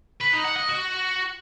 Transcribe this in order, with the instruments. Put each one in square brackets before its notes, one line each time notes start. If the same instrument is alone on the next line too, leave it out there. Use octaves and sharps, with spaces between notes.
[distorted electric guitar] B4
D#4
F#5
D#5
F#4